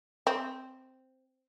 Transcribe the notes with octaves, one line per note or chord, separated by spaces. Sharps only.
C4